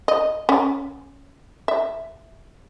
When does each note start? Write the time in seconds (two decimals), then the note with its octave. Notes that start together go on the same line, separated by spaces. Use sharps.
0.08 D#5
0.49 C#4
1.68 E5